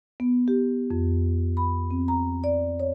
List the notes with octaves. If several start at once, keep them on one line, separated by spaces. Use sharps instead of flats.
B3
G4
F2
B5
C4
A#5
D5
C#5